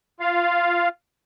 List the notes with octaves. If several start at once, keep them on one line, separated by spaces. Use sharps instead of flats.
F4 F5